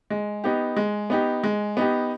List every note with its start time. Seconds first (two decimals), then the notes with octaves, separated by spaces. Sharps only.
0.10 G#3
0.44 B3 D#4 G4
0.77 G#3
1.10 B3 D#4 G4
1.44 G#3
1.77 B3 D#4 G4